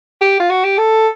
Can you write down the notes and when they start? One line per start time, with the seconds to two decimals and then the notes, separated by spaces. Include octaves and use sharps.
0.21 G4
0.40 F4
0.50 F#4
0.64 G4
0.78 A4